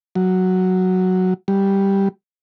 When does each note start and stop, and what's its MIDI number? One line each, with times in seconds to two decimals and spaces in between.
0.15 1.34 54
1.48 2.08 55